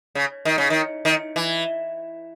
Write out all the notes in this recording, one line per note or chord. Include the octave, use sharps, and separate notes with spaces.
C#3
D#3
C#3
D#3
D#3
E3